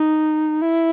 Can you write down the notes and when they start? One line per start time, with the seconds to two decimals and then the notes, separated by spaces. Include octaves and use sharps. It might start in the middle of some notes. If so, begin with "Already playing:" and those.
Already playing: D#4
0.62 E4